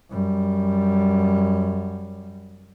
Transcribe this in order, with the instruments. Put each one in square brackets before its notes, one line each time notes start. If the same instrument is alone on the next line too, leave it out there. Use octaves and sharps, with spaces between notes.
[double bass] F#2 G3